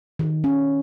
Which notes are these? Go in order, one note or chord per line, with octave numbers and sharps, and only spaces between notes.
D#3
D#3 C#4